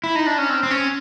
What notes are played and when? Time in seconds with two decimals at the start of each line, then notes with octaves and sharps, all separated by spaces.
0.04 E4
0.16 D#4
0.27 D4
0.38 C#4
0.50 C4
0.63 C4
0.71 C#4